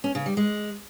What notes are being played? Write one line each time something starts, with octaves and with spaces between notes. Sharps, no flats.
C#4
C#3
G3
G#3